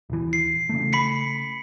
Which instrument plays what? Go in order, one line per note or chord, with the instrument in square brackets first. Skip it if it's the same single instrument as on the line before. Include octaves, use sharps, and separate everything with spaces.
[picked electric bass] D#1 E3
[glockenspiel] C7
[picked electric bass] C#3 A3
[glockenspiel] B5 B6 C#7